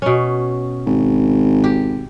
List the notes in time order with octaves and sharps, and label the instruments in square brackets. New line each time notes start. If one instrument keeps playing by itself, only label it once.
[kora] B2 C#4
[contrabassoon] G#1
[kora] G4